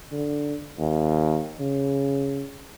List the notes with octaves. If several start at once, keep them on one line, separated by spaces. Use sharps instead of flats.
D3
D#2
C#3